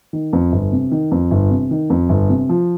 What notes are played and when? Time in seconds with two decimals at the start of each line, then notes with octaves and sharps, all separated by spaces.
0.13 D#3
0.33 F2
0.52 G1
0.73 C3
0.91 D#3
1.12 F2
1.31 G1
1.51 C3
1.71 D#3
1.90 F2
2.09 G1
2.30 C3
2.49 F3